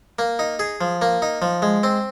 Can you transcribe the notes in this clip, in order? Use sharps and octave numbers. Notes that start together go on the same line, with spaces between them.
A#3
D#4
G#4
F3
A#3
D#4
F3
G#3
C4